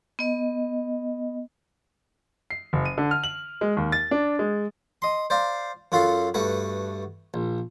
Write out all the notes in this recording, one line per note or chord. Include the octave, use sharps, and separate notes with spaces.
B3 D#5
C7
F#1
D#7
D3
F6
F#7
G#3
D#2
A6
D4
G#3
D#5 C6
C5 D5 F5 A#5
F#2 F4 F#4 A4 F5
G2 A3 F#4 B4
A#1